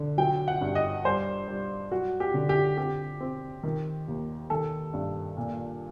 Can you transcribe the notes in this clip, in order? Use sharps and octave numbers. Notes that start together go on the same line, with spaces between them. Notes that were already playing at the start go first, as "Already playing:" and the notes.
Already playing: D3
F#3 G5
F#5
G2
D#5
G3 C5
G3
F#3 F#4
G4
D3
G4
C4 G4
C4
D#3
D#2
D#3 A4
G2
A#2